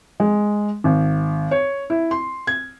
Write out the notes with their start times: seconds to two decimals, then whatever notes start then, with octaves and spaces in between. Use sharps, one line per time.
0.20 G#3
0.84 G#1
1.51 C#5
1.90 E4
2.11 C6
2.47 G#6